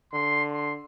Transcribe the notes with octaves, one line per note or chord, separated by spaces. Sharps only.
D3 C6
C6